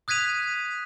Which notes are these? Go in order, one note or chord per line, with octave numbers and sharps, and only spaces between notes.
D#6 F#6 G#6 B6 D#7 F7